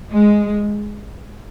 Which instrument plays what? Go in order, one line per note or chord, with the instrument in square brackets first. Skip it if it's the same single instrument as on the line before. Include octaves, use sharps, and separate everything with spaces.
[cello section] G#3